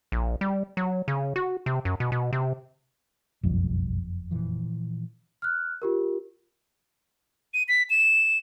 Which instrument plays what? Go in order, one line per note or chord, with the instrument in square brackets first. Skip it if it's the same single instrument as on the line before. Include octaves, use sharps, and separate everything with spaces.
[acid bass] A#1
G3
F#3
C#3
F#4
C3
F#2
B2
B2
C3
[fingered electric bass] F#1 F2 [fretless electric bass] B1 G3
[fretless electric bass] A#2 E3 F3
[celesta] F6 F#6
F4 G4 A#4
[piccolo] D#7
B6
E7